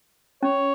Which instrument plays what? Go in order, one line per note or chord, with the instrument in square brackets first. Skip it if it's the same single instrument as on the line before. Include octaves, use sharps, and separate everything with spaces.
[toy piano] C#4 [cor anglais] C#5